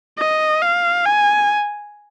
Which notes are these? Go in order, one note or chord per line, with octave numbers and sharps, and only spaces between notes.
D#5
F5
G#5